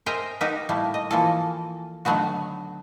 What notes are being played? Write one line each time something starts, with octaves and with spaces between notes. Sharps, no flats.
A#4 C5 D#5 E5 G5 G#5
B3 D#4 F#4 G4 A#4 B4
A2 G3 A3 A#3
D#5
E3 F3 A#3 A4
D3 D#3 F#3 A3 B3 F#4